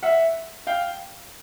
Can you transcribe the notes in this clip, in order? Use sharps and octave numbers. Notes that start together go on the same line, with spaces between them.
E5 F#5
F5 G5